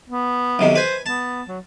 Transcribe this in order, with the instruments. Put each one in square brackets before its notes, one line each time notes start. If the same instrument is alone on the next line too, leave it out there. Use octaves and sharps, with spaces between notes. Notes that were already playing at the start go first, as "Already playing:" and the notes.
[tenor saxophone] B3
[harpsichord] B1 C3 D#3
[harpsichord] B4 G#5 [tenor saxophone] C5
[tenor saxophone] B3 [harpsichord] A5
[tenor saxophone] F#3